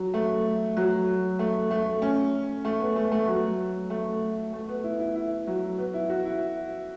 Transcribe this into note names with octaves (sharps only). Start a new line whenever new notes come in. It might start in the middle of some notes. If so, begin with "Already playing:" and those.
Already playing: F#3
A3
F#3
A3
A3
C#4
A3
B3
A3
A3
F#3
A3
A3
B3
E4
E4
E4
F#3
B3
E4
F#4
E4